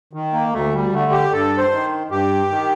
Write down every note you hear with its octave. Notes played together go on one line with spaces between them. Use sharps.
D#3
A#3
D2 A3
G3
D3 A3
G4
G2 A4
C5
D#3
G2 G4
D#3